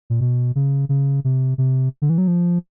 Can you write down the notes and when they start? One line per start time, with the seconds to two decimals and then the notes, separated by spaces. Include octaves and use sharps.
0.10 A#2
0.21 B2
0.55 C#3
0.89 C#3
1.24 C3
1.58 C3
2.02 D3
2.10 E3
2.18 F#3
2.28 F3